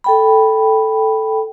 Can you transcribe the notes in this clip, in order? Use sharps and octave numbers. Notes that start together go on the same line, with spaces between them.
A4 G5 B5